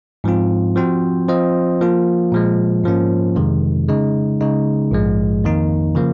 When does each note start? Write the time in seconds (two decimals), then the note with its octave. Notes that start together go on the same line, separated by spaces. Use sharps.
0.24 G#2 F3 C4 F4
0.76 F3 C4 F#4 C5
1.28 F3 C4 F4 C5 D#5
1.81 F3 A#3 F4
2.32 A#2 F3 G#3
2.84 G#2 F3 A#3 C#4
3.36 F2 C3 D#3 G#3
3.88 C#3 G#3 D#4
4.41 C#3 G#3 D#4
4.91 A#1 G#2 F3 G#3
5.44 F2 D#3 A#3 D#4
5.95 C#3 F3 A#3